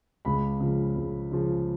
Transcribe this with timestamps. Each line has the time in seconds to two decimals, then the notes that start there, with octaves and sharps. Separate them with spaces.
0.25 C#2 B5
0.60 C#3 F3
0.96 C#2
1.32 C#3 F3